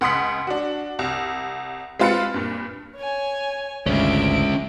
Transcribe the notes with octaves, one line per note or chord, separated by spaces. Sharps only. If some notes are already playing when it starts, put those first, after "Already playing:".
C#2 F#5 C6 D#6 B6
D4 F#4
C2
G#3 C4 F4 B4 A6 C#7
G2 A#2
C#5 G#5
G#1 D2 G#3 C#4 E5 D7